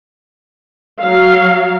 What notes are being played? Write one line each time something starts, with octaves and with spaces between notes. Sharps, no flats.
F#3 F5